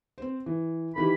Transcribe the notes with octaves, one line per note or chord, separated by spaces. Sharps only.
C4 C5
E3
D#3 E3 G4 B5